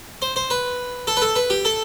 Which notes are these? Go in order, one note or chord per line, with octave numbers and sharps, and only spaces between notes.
C5
C5
B4
A4
B4
A4
B4
G4
A4